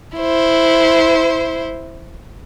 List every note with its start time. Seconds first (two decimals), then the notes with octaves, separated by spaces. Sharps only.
0.17 E4 C5